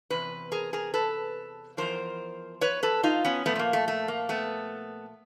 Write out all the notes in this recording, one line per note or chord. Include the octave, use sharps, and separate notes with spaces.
E2 C3 B4
G#4 A#4
G#4 A#4
A4 B4
E2 C3 F3 A#4 C5
B4 C#5
A4 B4
D#4 F4
B3 C#4
A#2 F3 A3 B3
B3
A#3
A3
A3
A#3
A3 B3